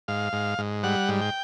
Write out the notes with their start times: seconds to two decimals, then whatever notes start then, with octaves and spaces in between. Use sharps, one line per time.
0.08 G#2 F5
0.33 G#2
0.58 G#2
0.83 G3 F#5
1.09 G#2
1.21 G5